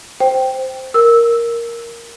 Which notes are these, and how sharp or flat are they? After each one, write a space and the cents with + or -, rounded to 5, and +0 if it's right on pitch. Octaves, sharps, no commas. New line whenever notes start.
C5 +0 G5 +0
A#4 +0 E6 -10